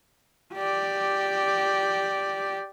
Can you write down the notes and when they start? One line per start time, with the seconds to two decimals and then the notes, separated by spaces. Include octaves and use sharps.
0.54 G4 D5